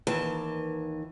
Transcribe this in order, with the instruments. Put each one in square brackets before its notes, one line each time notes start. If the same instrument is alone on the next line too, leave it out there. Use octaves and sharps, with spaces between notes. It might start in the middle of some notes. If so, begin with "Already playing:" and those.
[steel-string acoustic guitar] D#2 D#3 E3 A5